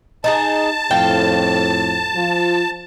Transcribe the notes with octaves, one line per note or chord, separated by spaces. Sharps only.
D#4 F#4 G#4 A5
F2 A2 F5 G5
F3 F4